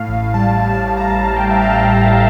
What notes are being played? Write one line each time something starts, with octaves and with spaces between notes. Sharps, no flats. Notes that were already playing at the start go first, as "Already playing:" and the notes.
Already playing: A2 F5
A1
G3 A5
A1
A2 A5
A#5
A1 A5
G3 G5
E5
F5